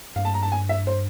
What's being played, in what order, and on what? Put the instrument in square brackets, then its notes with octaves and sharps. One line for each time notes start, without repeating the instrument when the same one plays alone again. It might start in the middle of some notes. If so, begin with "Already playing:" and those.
[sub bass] G2 [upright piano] F5
[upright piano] A5
A#5
A5
G#5
E5
C5